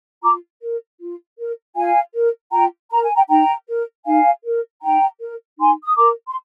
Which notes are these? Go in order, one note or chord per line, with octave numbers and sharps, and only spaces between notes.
F4 A#5 D6
A#4
F4
A#4
F4 F5 G#5
A#4
F4 G5 A#5
A#4 A#5
G#5
G5 A#5
D#4 G5 A#5
A#4
D#4 F5 G#5
A#4
D#4 G5 A#5
A#4
D#4 G#5 C6
D#6
A#4 A#5 D6
C6